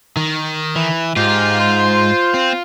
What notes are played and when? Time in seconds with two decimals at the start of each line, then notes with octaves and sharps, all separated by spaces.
0.17 D#3
0.76 E3
1.16 G#2 F4 G4
1.60 C5
2.34 C4